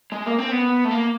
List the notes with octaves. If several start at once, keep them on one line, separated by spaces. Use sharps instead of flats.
G#3
A#3
C4
B3
A3
A#3